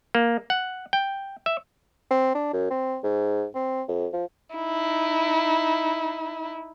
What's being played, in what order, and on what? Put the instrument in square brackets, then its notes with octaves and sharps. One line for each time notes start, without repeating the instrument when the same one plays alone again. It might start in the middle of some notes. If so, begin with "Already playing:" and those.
[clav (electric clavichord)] A#3
F#5
G5
E5
[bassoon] C4
D4
F#2
C4
G#2
C4
F2
F3
[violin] D#4 E4